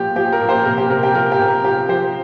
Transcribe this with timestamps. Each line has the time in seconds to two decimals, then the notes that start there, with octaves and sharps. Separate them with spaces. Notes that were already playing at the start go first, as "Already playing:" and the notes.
Already playing: A#2 F3 G4
0.16 F3 G4
0.33 A#4
0.41 A#2
0.49 G4 C5
0.65 C3 A#4
0.78 G4
0.90 C3 A#4
1.03 G4
1.14 F3 A#4
1.32 G4
1.39 C3
1.48 A#4
1.64 F3 G4
1.89 F3 G4 C5